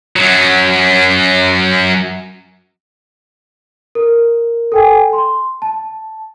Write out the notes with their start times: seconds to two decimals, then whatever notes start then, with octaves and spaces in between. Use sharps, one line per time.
0.16 F#2 F#3
3.95 A#4
4.72 A4 G5 G#5
5.13 C6
5.62 A5